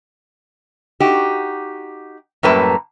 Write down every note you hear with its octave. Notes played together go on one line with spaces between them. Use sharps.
D#4 F#4 G4
F#2 A2 G3 A#3 B4 A5